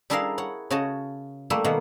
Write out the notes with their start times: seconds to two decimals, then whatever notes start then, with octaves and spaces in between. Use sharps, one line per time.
0.10 G3 D4 E4 G#4 A#4 F5
0.38 C#5 F#5
0.71 C#3 F#4 C#5 D#5 A5
1.50 G3 A3 A#3 E4
1.64 B2 D#3 A#3 F#5